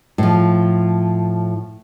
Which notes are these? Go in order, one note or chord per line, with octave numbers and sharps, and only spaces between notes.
A2 F3